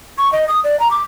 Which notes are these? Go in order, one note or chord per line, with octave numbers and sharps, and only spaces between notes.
C#6
D#5
D#6
D5
A#5
D6